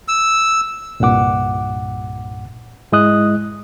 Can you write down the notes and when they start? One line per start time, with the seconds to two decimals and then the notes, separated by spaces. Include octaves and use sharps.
0.08 E6
1.00 C2 G2 A#2 F#5 D6
2.92 G#2 G#3 E4 D#5 D#6 F#6